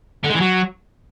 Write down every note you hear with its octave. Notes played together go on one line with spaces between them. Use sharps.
D3
G#3
E3
F#3